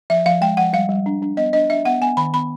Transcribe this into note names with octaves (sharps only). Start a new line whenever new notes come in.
F3 E5
F3 F5
G#3 G5
F3 F#5
G3 F5
G3
D4
D4
B3 D#5
D4 D#5
D4 E5
B3 F#5
B3 G#5
D#3 B5
B3 B5